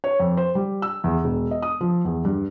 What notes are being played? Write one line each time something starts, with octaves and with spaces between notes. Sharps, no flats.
C#5
F2
C5
G3
E6
E2
E1
D#5
D#6
F3
E2
G2